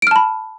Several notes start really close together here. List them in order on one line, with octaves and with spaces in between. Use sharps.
D7 F6 A5 B5